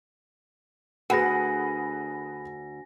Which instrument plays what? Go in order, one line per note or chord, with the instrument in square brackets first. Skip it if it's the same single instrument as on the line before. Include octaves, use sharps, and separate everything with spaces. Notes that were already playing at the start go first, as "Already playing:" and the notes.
[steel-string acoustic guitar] D2 [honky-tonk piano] G#4 B4 F#5 [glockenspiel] G#5 A#6